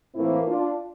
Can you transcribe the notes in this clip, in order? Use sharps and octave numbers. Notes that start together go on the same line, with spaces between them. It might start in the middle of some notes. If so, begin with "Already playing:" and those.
A2 E3 A#3 C4 E4
D4 F4